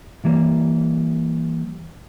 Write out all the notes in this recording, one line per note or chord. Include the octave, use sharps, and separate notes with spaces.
E3 G3 A#3